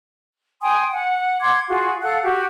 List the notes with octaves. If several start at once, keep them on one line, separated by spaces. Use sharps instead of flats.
G5 G#5 C6 D#6
F#5
F#5 C6 D6 G#6
F4 F#4 G#4
A4 F5 F#5 F#6
F#4 G4